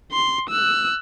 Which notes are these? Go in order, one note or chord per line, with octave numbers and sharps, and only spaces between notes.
C6
E6 F#6